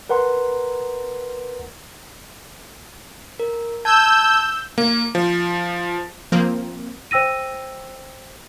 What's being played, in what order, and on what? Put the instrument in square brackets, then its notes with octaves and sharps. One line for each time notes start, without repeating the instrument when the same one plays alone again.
[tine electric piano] A#4 B4 F#5 A#5 C6
[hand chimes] A#4
[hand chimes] A5 G#6 [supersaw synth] E6 G6
[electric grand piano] A#3
F3
[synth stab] F3 A#3 C4
[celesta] C5 G5 E6 A#6 D#7